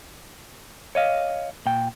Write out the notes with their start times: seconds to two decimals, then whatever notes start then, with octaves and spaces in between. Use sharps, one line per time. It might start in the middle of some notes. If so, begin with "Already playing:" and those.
0.95 C#5 D#5 F5
1.66 A#2 G5